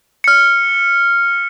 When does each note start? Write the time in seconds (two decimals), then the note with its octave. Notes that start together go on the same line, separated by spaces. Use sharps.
0.24 F6 C#7